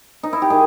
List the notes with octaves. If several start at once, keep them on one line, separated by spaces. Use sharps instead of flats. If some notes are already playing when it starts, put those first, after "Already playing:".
D#4
E4
G4
D#3 G#3 G#4